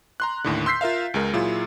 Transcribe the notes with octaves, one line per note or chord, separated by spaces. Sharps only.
A#5 C6 F#6
D#2 A2 D3
C6 E6 G6 B6 C7
F4 A#4 E5 F5
C#2 G#3 A#4
A#2 F#3 E4 F4 G#4